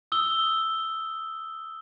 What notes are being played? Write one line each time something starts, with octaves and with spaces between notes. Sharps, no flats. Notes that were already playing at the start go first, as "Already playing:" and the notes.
D#6 E6 G7